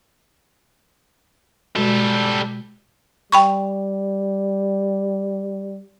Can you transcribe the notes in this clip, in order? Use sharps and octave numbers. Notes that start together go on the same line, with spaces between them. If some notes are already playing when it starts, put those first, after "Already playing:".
B2 G3 G#3 F#4 A4
G3 G5 B5 C#6